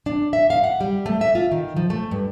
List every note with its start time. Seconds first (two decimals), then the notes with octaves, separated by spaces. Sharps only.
0.06 D4
0.33 E5
0.50 F5
0.64 F#5
0.80 G3
1.06 A3
1.21 E5
1.35 F4
1.51 D#3
1.76 F3
1.90 A3
2.11 G2